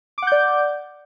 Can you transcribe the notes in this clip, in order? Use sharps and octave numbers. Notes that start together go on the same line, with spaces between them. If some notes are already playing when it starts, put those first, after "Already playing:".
D5 F#5 D6 G6